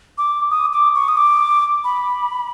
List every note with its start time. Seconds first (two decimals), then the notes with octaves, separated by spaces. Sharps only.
0.18 D6
0.51 D#6
0.73 D6
0.95 C#6
1.08 D#6
1.17 D6
1.84 B5